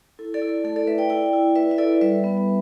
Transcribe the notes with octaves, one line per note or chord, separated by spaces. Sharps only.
E4 A4
A4 D5
E4
A4
A3 A4
A4 D5
A3 B4 E5
D5 G5
E4 D5 G5
E4
E4 B4 E5
E5
E4 A4 D5
G3 B4 E5
B3